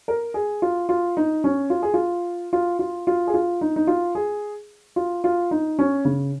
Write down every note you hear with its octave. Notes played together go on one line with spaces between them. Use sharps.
A#4
G#4
F4
F4
D#4
C#4
F4
G#4
F4
F4
F4
F4
G#4
F4
D#4
D#4
F4
G#4
F4
F4
D#4
C#4
C#3